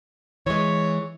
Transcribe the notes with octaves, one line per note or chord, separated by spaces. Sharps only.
E3 G#3 C#5